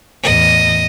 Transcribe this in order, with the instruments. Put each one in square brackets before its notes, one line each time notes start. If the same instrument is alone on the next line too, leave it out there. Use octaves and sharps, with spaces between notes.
[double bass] E2 A2 [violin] D#5